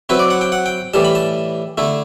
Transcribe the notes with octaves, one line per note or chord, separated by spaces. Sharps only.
F#3 C4 E4 B4
D5
F#5
G5
F#5
G5
A2 E3 G3 A5
B5
A5
D3 A3 E4